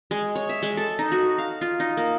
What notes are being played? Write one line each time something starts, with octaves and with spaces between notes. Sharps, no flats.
G#3
C#5
E5
G#3
A4
D#4
F#4
F5
F4
D#4
A#3